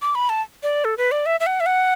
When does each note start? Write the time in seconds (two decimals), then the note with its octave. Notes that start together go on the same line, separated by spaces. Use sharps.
0.02 D6
0.15 B5
0.29 A5
0.63 D5
0.85 A4
0.98 B4
1.12 D5
1.26 E5
1.40 E5
1.46 F#5
1.60 E5
1.66 F#5